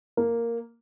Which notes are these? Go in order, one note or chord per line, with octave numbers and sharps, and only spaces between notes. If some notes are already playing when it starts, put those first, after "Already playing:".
A#3